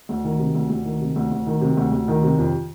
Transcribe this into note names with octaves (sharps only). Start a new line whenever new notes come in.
D2
D#3
C3
D2
D2
D#3
C3
D2
D2
D#3
C3
D2
D2
D#3
C3
F2